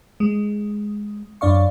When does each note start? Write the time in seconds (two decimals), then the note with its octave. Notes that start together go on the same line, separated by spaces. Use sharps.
0.20 G#3
1.41 F#2 D4 D5 F5 C#6